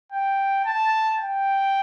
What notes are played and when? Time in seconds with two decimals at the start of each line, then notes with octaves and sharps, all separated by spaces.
0.12 G5
0.65 A5
1.18 G5